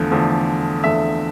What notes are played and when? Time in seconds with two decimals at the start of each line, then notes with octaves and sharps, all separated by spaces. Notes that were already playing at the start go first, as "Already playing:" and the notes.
Already playing: E2 D3 F3 A3
0.11 E2 D3 F3 A3
0.84 E2 D3 F3 A3 E5